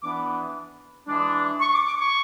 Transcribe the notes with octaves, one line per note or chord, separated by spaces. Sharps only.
E3 B3 D4 D6
E3 G#3 D4
C#6
D6
D6
C#6